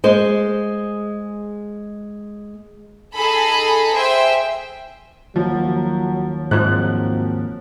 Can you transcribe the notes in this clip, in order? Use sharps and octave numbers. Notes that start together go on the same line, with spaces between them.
G#3 C5
D#4 G#4 A4 B5
G#4 C5 E5 G5
D#2 F3 F#3
G#2 F3 F#3 A#3 C4 F#6